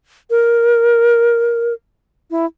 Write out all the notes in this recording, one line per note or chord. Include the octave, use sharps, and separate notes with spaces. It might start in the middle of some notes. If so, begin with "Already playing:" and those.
A#4
E4